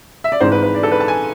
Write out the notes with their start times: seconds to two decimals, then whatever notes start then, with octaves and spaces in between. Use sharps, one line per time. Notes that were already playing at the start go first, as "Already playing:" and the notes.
0.24 E5
0.32 D5
0.40 G#1 G#2 E3 G#3 D4 C5
0.52 B4
0.63 B4
0.75 D5
0.83 A4
0.92 B4
1.00 A5
1.08 G#5